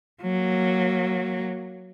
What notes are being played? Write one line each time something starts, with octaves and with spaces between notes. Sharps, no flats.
F#3 A#3